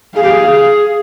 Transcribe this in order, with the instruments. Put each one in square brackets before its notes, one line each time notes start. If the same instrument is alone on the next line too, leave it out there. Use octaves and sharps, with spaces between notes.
[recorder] G#4 [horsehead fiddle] F5
[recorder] G4
G#4